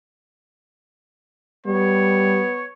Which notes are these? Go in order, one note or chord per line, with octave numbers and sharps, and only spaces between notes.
G3 B3 C#5